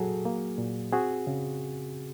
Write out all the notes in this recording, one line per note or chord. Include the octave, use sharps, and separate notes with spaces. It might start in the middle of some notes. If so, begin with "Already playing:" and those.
Already playing: A#2 F#3 F#4 G#4 A4
A#3
A#2
C4 F#4 G#4
C#3